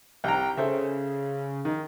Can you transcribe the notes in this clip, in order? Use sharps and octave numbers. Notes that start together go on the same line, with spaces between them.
C2 G5 A#5
C#3 A4 C5 E5
D#3